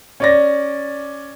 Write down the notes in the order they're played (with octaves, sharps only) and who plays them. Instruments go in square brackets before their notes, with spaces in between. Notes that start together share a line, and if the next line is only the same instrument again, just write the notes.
[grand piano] C#4 D5 A#6